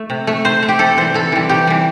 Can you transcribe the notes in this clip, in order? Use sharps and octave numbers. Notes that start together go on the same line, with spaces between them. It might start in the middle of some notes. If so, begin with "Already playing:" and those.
Already playing: A3
C3
A3
C3 C5
A3
G4
C3 A4
E3 G3 C5
C3 A4
E3 G3
C3 G4
E3 G3